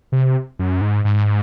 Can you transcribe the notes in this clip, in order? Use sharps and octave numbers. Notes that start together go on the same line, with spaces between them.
C3
F#2
G#2
G#2